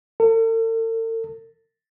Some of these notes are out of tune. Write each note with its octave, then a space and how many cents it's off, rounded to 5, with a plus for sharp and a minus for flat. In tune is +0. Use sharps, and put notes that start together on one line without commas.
A4 +45